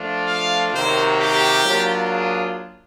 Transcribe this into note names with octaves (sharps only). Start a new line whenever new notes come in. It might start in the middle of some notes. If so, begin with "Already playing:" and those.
Already playing: F3 A3 D4 F4
F5
C3 D#3 F#3 A#3 C5
G4
F#3 A#3 D4 F4
G#4